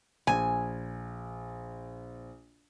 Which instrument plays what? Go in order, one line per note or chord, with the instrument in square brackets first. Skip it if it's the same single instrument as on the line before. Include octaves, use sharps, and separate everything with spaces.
[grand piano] A#1 [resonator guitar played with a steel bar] G#5